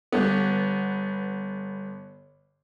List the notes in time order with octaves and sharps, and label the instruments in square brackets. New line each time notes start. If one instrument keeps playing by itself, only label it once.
[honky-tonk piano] G1 B3